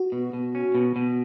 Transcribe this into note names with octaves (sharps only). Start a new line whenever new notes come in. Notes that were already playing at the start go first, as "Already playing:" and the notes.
Already playing: F#4
B2
B2
C#4
B2
B2